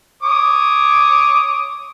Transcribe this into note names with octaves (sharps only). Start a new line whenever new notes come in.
C#5 D6 D#6